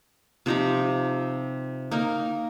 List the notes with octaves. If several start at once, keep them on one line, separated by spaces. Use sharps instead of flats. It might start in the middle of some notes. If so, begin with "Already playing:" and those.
C3 F3 D#4 G4
A#3 D#4 A#4